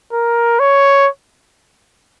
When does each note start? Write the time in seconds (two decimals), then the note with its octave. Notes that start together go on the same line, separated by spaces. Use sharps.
0.13 A#4
0.59 C#5